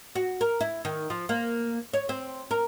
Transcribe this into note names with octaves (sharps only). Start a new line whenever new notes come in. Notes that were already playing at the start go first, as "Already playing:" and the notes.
F#4
A#4
E4
D#3
F3
A#3
C#5
C4
A#4